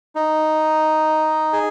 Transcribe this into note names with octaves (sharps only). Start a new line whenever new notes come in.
D#4
G#4